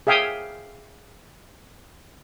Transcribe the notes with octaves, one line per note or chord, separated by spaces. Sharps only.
G#4 E5 F5 G5 G#5 D#6